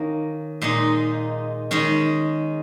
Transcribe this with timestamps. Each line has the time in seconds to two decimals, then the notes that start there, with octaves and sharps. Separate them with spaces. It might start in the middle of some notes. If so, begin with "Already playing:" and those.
Already playing: D#3 A#3 C#4
0.62 A#2 G#3 D#4
1.71 D#3 G#3 C#4